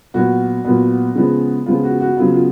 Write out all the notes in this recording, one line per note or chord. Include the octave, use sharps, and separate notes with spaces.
A#2 F#3 B3 F#4
A#2 F#3 B3
C#3 F3 G#3 B3
C#3 F3 G#3 B3 F4
F#4
F#4
C#3 F#3 B3 F4
F4